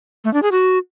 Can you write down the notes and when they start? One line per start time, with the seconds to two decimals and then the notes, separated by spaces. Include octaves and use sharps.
0.24 A3
0.34 D4
0.43 G#4
0.52 F#4